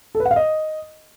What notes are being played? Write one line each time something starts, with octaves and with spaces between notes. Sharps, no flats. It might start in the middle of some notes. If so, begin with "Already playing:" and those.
A4
B4
F#5
F5
D#5